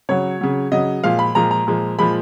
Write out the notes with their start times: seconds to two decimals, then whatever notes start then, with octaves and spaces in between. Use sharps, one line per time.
0.09 C#3 F#3 C#5
0.41 C#3 F#3
0.72 C#3 F#3 D#5
1.03 A#2 F3 G#3 F5
1.19 B5
1.35 A#2 F3 G#3 A#5
1.51 A#5
1.67 A#2 F3 G#3
1.99 A#2 F3 G#3 B5